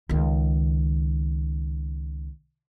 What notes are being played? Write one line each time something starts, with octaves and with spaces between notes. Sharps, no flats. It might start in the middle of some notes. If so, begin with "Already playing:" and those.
C#2 D#3